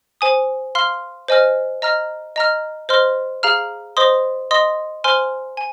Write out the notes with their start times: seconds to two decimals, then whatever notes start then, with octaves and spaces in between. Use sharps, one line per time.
0.21 C5 G#5 D#6
0.75 F5 C6 F6
1.28 C5 D#5 G#5 F6
1.82 D#5 A#5 F6
2.36 D#5 A#5 F6
2.89 C5 D#5 C6 F6
3.43 G#4 F5 A#5 F6
3.97 C5 D#5 C6 D#6
4.51 D#5 C6 D#6
5.04 C5 G#5 C6 F6
5.57 G#5